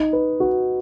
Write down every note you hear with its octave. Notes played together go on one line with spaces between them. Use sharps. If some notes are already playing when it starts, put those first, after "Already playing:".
Already playing: D#4
B4
F#4